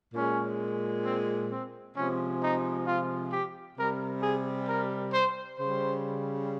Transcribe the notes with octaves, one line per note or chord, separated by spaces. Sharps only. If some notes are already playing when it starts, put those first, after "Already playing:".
A#2 G#3 C#4
C4
C4
C3 F3 G#3 C#4
D#4
F4
G4
C3 G3 A#4
G#4
A#4
C5
C#3 G3 C5